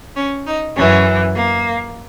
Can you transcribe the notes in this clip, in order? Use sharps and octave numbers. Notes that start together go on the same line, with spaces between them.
C#4
D#4
F#2 E3 C#4
A#3